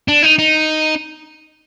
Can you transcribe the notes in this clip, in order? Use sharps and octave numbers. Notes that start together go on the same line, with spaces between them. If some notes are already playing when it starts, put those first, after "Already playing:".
D4
D#4
D#4